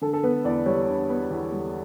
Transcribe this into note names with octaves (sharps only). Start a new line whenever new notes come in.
D3 A4
A4
B3 B4
E2 D5
G3 C#5
D3
B3
E2
G3